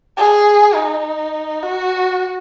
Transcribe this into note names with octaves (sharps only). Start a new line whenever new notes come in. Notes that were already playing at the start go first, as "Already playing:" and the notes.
G#4
D#4
F#4